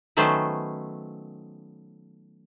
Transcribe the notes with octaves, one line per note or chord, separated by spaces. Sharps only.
D#3 F#3 A3 B3 C#4 C5